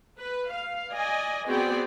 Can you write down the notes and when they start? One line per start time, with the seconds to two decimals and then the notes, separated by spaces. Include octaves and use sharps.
0.18 B4
0.50 F5
0.92 D5 D#5 G#5
1.46 B3 C4 F#4 G#4 D5 G5